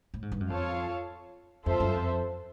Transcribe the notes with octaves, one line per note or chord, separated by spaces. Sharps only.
A2
G#2
G2
F#2
F2 F4 A4 C#5 F5 A5
F2 F4 A4 C5 E5
F#2
F2